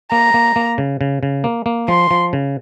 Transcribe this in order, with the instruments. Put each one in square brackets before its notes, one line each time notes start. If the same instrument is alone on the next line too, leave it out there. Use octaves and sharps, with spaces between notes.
[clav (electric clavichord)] A#3 [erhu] A#5
[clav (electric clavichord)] A#3
A#3
C#3
C#3
C#3
A#3
A#3
[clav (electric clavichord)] F3 [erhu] C6
[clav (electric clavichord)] F3
C#3